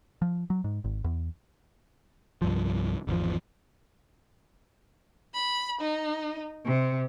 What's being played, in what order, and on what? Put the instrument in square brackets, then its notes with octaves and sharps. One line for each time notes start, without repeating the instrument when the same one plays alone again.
[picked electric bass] F3
F#3
G#2
G#1
E2
C2 G2 F3
G#1 E2 F3
[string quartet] B5
D#4
C3